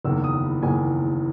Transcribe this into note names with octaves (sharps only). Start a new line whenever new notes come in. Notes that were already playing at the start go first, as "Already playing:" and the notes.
F#1 E2 D#3 E6
D#6
B5
F#1 E2 D#3 G#5